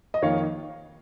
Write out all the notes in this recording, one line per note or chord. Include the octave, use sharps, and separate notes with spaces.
D#5
F2 D#3 A#3 C#5 F5